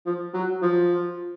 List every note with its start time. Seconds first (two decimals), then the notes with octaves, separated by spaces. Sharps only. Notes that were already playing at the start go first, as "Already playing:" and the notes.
0.06 F3
0.34 F#3
0.62 F3